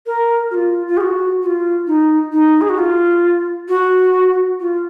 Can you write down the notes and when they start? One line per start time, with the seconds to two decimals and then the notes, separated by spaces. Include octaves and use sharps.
0.06 A#4
0.51 F#4
0.54 F4
0.87 F4
0.97 G#4
1.01 F#4
1.42 F#4
1.46 F4
1.87 D#4
2.33 D#4
2.61 G#4
2.69 F#4
2.78 F4
3.69 F#4
4.60 F4